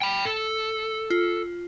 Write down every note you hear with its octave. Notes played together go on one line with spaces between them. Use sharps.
G5 B5
A4
F4